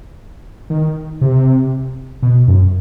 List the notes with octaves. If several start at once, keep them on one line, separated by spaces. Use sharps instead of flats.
D#3
C3
B2
F#2